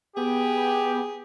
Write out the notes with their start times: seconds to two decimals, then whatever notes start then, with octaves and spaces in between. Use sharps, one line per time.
0.17 B3 G4 G#4